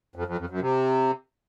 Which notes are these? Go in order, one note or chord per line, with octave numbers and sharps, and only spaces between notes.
F2
F2
F2
F#2
C3